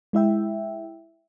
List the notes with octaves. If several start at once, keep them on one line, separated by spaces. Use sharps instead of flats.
G#3 E4 E5 G5